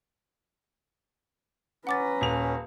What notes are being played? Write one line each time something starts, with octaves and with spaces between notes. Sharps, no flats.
C#4 B4 F#5 A#5 D6 A6
D#1 F7